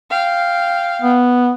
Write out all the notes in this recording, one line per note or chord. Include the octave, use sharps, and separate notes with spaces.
F5 G5
B3